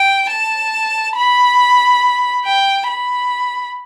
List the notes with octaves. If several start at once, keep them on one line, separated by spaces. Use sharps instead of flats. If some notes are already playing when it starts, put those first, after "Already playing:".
Already playing: G5
A5
B5
G5
B5